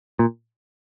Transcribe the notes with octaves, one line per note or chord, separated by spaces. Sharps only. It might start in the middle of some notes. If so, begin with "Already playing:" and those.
A#2